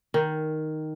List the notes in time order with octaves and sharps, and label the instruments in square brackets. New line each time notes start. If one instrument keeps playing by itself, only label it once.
[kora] D#3